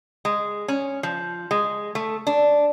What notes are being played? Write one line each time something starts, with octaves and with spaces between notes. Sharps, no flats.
G#3
C#4
F3
G#3
A3
D4